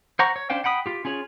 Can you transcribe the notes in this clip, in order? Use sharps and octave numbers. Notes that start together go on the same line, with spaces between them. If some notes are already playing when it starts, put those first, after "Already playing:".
C5 F#5 A#5 C#6
C#5
C#4 D4 C5 F5 G5
F#5 G5 B5 D#6
F4 G4
C#4 F4 G#4 C#5